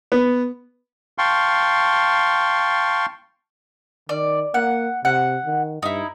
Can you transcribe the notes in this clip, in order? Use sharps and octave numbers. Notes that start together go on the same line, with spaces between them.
B3
F5 G5 A5 C6 C#6
D#3 D5
A#3 F#5
C3 F#5
D#3
G2 D#4 E4